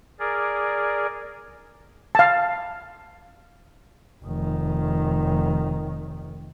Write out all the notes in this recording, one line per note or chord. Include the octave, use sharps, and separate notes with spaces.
G#4 A#4 D5
F5 A5
F1 D#3